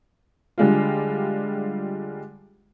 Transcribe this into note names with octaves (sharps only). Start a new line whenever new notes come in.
D3 G3 G#3 F4